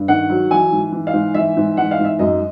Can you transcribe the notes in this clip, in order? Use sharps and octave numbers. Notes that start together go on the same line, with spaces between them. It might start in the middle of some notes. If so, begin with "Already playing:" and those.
Already playing: G2
D#3 F#5
F#3
E3 G#5
G#2
E3
F5
G#2
E3 E5
G#2
E3 F#5
F5
G#2
E5
F#2 D#5